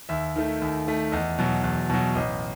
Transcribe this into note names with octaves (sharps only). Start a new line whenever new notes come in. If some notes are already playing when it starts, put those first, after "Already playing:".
D#2 E5
D#3 A3
D#2
D#3 A3
E2 D#5
B2 F#3
E2
B2 F#3
A1 D#5